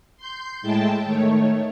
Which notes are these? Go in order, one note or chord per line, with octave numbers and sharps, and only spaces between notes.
C6 G6
A2 G#3 E4 G5 A5
D#3 A3 C#5